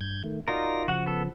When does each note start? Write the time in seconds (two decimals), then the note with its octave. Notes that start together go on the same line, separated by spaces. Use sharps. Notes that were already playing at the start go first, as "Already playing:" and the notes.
0.01 G2 G6 G#6
0.24 D#3 A3
0.48 D#4 F4 F#4 A#4 D5 A#6
0.88 C#3 F3 F#4 F#5
1.06 B3 A4